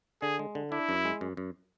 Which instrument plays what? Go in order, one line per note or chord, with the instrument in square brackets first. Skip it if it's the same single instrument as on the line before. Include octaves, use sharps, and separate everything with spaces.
[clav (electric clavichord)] D3 [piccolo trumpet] G#4
[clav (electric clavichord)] G#3
D3
[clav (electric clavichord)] D4 [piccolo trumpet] E4
[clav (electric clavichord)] F#2
G#3
F#2
F#2